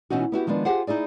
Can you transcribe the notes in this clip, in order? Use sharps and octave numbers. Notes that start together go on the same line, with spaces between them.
B2 E3 C#4 D#4 F#4
B3 E4 F#4 G4
D#3 F3 G#3 B3 D4
F4 G4 G#4 C5 F5 F#5
D#4 E4 G#4 D5